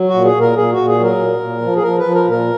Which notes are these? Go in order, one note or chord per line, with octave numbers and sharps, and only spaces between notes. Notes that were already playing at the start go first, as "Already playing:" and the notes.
Already playing: F#3
F#4
A#2
G#4
A#2
A#4
A#2 G#4
F#4
A#2
G#4
F#3 A#4
A#2
A#2
F3
G#4
F3 A#4
B4
F3
A#4
A#2
A#4